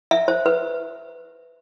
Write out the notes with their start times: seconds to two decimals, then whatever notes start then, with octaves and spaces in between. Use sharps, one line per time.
0.11 E5
0.28 C5
0.46 B4